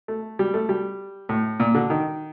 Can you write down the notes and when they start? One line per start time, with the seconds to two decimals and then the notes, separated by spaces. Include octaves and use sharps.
0.08 A3
0.39 G3
0.54 A3
0.69 G3
1.29 A2
1.60 A#2
1.75 D3
1.90 D#3